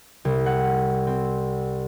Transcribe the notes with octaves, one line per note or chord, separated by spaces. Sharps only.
C2
F#5
C4